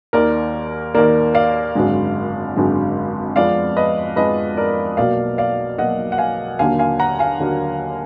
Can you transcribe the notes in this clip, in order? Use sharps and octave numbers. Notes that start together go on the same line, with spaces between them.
D#2 D#3 A#3 A#4 D5
D#2 D#3 A#3 A#4 D5
D5 F5
G#1 F#2 D3 G#3
G#1 F#2 D3 G#3
F2 F3 G#3 B3 D5 F5
B4 D#5
F2 F3 G#3 B3 B4 D#5
A#4 D5
B1 B2 F#3 A#3 D5 F5
D5 F5
B1 B2 F#3 A#3 D#5 F#5
F#5
F5 G#5
D#2 D3 F#3 A#3 F5 G#5
F5 G#5
F#5 A#5
F5 G#5
D#2 D3 F#3 A#3